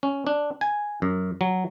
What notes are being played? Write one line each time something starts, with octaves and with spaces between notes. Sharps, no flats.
C#4
D4
G#5
F#2
F#3